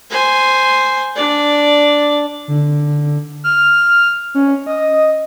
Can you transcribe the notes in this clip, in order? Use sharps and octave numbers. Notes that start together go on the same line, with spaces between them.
C5 G#5
D4 D5
D3
F6
C#4
D#5